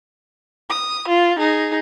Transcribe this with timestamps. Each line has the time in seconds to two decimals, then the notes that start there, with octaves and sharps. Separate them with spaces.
0.70 D#6
1.08 F4
1.39 D#4 G#4